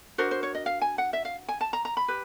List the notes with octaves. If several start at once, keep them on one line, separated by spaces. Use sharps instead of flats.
D4 F#4 A#4 C5
C5
C#5
D#5
F5
G#5
F#5
E5
F5
G#5
A5
A#5
A#5
B5
G4 B4